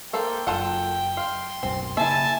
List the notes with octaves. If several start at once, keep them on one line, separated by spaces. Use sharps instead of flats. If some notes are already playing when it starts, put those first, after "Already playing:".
A#3 A4 C5 G5
F#1 F#2 F4 A4 F#5
F5 C6
D1 B1 F#2 C4
C#3 A#3 E4 E5 G#5 A5